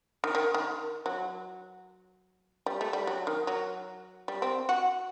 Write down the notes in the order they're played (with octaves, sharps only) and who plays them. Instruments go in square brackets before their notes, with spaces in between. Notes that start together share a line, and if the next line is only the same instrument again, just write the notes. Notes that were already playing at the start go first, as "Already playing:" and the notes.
[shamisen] D#3
D#3
D#3
F#3
G3
A3
G3
F#3
D#3
F#3
G3
C4
F#4